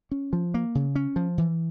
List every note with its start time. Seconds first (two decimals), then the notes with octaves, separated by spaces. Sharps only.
0.11 C#4
0.33 F3
0.54 A#3
0.75 C#3
0.96 C#4
1.16 F3
1.38 E3